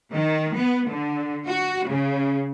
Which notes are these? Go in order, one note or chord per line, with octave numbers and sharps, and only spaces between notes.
D#3
B3
D3
F#4
C#3